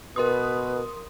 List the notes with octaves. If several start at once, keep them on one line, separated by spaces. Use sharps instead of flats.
B2 A#4 B4 C6 D#6